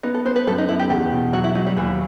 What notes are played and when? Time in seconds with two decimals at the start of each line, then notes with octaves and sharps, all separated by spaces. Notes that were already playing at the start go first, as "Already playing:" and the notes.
0.03 B3 D#4
0.15 A4
0.25 B3 C5
0.36 B4
0.47 F#2 A4
0.58 D#4
0.69 B3 E4
0.80 G4
0.90 E2 G4
1.12 B2
1.33 F#3 F#4
1.44 E4
1.55 F#3 D#4
1.67 G3
1.77 D#2 E3